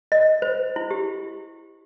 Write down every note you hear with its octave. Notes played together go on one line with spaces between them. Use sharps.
D#5
C5
E4
G4